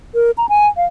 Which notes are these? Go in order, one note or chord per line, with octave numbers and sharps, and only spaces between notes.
A#4
A#5
G#5
F5